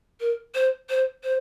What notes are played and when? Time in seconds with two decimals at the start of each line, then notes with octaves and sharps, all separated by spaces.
0.20 A#4
0.55 C5
0.90 C5
1.24 C5